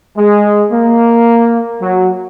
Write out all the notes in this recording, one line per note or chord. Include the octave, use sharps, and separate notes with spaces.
G#3
A#3
F#3